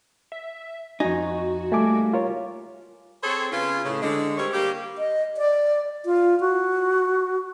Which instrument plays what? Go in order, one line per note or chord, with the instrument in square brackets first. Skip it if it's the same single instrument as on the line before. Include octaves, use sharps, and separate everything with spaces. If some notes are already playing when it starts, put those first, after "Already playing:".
[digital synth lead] E5
[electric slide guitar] F2 G#5 [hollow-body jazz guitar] D#4 [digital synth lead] F#4
[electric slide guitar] G3 A#3 [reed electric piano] A3 G#5 D6
[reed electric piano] F4 A#4 C#5
[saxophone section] C4 G#4 A4 C5 C#5
C#3 B3 F4
A2 C#3
D3 G#3
G3 C4 A#4 C#5
G3 A#3 G4
[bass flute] D#5
D5
F4
F#4